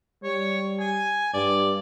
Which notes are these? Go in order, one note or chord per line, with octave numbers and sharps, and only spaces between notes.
G3 C#5
G#5
G2 D5